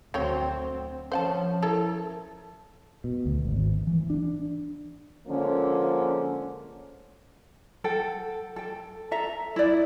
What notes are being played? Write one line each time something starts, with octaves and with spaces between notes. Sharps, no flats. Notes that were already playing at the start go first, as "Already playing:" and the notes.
D2 F#3 C4 C#5 G5
F3 C#4 C5 F#5 A5
E4 A4 A#4
B2
D2
G#1
E3
D4
D3 F3 G#3 A#3 C#4
A4 F#5 G5
A4 G5
A4 E5 A#5
E4 D5